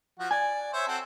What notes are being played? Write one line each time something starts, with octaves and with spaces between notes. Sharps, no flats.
F3 F#4
D5 G#5
C5 C#5 E5
C4 F#4 A4